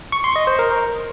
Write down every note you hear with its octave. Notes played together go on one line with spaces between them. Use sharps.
C#6
C6
D#5
C5
A#4